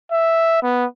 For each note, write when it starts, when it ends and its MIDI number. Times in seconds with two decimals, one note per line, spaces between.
0.12 0.60 76
0.63 0.85 59